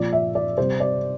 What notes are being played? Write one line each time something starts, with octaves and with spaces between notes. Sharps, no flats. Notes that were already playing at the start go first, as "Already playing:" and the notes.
Already playing: A#2 F3 D5
E5
D5
C3 G3 C5
D5